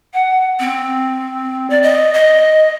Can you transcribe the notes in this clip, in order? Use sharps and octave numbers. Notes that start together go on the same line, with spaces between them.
F#5
C4
D5
D#5
D#5